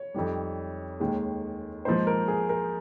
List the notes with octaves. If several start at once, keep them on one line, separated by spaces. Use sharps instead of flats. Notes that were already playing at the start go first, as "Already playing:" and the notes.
Already playing: C#5
F2 D#3 G3
D#2 D#3 G#3
G#2 F3 A#3 D#4 C5
A#4
G#4
A#4